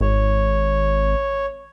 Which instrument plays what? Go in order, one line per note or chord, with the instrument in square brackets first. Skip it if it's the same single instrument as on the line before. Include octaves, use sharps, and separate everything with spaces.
[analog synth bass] G#1 [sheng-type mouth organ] C#5